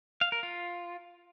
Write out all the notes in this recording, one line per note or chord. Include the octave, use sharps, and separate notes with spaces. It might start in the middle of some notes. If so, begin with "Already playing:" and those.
F5
A#4
F4